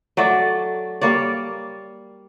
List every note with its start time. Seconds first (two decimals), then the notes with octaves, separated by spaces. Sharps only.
0.17 F#3 A3 D5
1.01 G3 A#3 C#5 D5